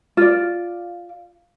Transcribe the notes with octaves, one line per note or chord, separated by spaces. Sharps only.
F4 D5